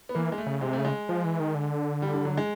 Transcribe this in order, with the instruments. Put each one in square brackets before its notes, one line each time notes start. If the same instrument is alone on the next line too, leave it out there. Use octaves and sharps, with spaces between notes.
[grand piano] B3
[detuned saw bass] E3 [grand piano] A#3
[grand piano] G#3
A3
[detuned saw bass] C#3
[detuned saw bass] C3 [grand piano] G#3
[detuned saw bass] C#3 [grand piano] A3
[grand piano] G#3
[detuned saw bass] F3
E3
D#3
D3
[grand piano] G3
G3
F#3
G#3